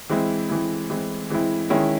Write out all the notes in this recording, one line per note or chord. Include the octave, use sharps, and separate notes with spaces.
E3 G#3 C4 E4
E3 G#3 C4 E4
E3 G#3 C4 E4
E3 G#3 C4 E4
D#3 G#3 C#4 E4